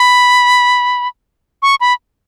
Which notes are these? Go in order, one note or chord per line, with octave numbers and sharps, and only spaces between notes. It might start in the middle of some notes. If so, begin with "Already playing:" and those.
Already playing: B5
C#6
B5